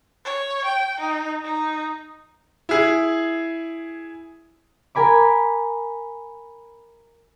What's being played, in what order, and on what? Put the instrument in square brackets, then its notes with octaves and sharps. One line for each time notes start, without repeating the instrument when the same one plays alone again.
[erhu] C#5
G5
D#4
D#4
[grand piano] E4 G#4
[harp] A#4 G#5 B5 D6